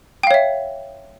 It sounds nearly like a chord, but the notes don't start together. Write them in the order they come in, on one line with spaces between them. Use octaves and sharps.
G5 F5 C#5 E5